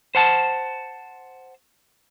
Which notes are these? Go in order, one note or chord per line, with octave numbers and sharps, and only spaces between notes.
C5 F#5 A5